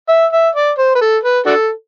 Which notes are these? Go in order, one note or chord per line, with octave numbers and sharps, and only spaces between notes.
E5
E5
D5
C5
B4
A4
B4
D4 F#4 A4